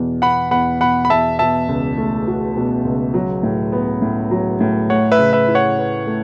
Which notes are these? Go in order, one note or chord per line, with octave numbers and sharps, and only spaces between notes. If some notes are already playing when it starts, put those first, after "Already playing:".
Already playing: E2 B2
B3 F#5 B5
E2 F#5 B5
B2 F#5 B5
B5
E2 E5 A5
B2 E5 A5
C#2
A3
F#4
B2
C#2
F#3
A2
B3
A2
F#3
A2
A3 C#5 F#5
B4 E5
C#3
B4 E5
E4
C#5 F#5
B4
A3